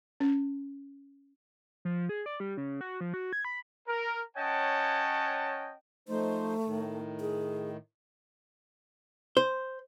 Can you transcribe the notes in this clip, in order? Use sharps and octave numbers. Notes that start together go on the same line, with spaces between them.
C#4
F3
G#4
D5
G3
C#3
F#4
F3
F#4
G#6
B5
A#4
C#4 C#5 D#5 F#5 G5 A5
F3 A3 D#4 C5
A2 D#3
G#4
C5